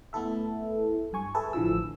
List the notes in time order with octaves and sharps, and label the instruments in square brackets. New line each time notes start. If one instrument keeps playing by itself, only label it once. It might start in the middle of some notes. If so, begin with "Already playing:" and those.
[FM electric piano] A3 B3 E4 A4 E5
G2 G#5 C#6
G#4 A4 B4 E5 G#5 A5
A1 D3 E3 F3 E6